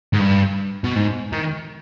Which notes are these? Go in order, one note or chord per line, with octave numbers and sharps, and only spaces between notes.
G#2
G2
B2
G#2
D#3